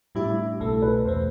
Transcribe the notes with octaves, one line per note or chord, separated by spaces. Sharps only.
A2 G3 D4 E4 G4
E4
C2 B2 A3 A4
B4
E2 B2 A3 C5